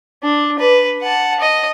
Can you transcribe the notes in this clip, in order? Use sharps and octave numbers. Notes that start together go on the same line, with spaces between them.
D4
B4
F#5 A5
D#5